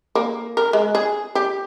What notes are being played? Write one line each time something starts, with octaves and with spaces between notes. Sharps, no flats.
A#3
A#4
G#3
G#4
G4